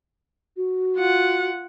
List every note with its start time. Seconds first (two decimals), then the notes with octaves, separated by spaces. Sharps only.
0.57 F#4
0.97 F4 F#5